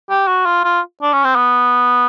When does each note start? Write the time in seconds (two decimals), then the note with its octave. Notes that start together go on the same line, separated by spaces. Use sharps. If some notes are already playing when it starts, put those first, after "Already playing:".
0.10 G4
0.27 F#4
0.46 F4
0.64 F4
1.02 D4
1.13 C#4
1.24 C4
1.36 B3